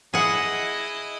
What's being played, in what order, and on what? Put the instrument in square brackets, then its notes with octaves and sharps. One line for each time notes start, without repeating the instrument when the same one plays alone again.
[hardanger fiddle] E4 D#5 [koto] G#4 F#5